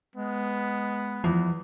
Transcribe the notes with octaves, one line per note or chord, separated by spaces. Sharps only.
G#3 B3
E2 F3